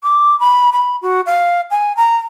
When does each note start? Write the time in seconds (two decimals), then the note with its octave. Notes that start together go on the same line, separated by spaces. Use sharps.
0.03 D6
0.40 B5
0.73 B5
1.02 F#4
1.26 F5
1.71 G#5
1.97 A#5